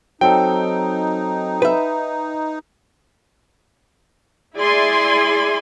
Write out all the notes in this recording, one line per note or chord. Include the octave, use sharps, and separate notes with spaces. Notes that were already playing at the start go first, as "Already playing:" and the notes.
F#3 C4 D#4 A4 G5
B4 E5
E4 G#4 D5 E5 G#5 C6